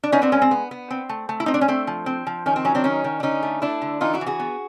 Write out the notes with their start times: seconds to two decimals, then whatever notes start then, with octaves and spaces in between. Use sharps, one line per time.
0.03 D4
0.12 B3 C#4 D#4
0.22 C4 D4
0.32 G#3 C#4
0.42 C4
0.51 B3
0.71 B3
0.91 C4
1.09 A3
1.29 A3
1.40 E4
1.46 C4 D#4
1.54 D4
1.61 C#4
1.68 A3 C4
1.87 F3
2.06 C4
2.27 F3
2.46 D#3 C#4
2.56 C4
2.65 F#3 C#4
2.75 C4 D4
2.84 D#3 C#4 D#4
3.04 D#3
3.20 D4
3.23 D3 C#4 D#4
3.43 A3
3.62 A3 D4 E4
3.82 D3
4.01 E3 D#4 F4
4.13 E4 F#4
4.21 E3
4.27 F#4 G#4
4.40 B3